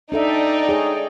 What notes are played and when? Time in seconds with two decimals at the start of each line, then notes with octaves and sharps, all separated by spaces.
0.12 D4 D#4 A4 D5 E5 G5
0.69 G#4 C#5